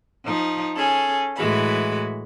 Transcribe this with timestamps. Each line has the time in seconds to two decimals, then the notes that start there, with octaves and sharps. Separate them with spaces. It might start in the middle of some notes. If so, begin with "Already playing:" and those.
0.24 F3 D#4
0.75 C#4 G#4 A4
1.36 A2 E3 G#3 F#4 B5